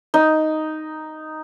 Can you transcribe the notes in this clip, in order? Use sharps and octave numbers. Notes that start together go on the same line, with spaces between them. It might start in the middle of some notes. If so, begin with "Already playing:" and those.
D#4